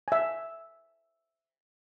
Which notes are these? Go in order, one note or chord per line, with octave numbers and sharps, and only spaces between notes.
E5 G#5